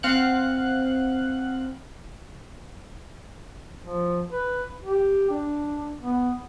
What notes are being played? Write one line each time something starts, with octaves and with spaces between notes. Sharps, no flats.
C4 F5 F#5 F#6
F3
B4
G4
D4
B3